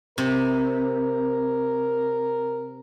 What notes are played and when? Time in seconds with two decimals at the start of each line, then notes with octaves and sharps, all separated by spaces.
0.18 C3 A#4